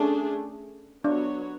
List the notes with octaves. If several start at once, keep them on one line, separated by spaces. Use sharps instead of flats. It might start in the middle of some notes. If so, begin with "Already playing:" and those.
Already playing: A3 C#4 D4 G#4
F#3 B3 D4 F#4 C#5